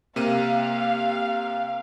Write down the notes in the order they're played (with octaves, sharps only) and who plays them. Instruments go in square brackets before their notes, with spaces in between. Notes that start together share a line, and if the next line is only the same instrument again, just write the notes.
[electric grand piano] C3 A#3 D#7 [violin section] F5